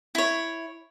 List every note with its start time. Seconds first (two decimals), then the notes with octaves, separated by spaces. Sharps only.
0.15 E4 C#5